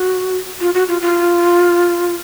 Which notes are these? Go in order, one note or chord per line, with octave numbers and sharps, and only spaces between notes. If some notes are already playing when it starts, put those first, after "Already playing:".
Already playing: F#4
F4
F#4
F4
F4